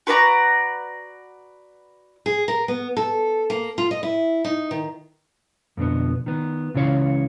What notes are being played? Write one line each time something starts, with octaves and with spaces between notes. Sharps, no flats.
F#4 B4 D5 A#5
G#4
A#4
B3
A4
A#3
F4
D#5
E4
D#4
D#3
F2 B2 D3 B3
D#3 B3
C#2 C#3 E3 C#5 F5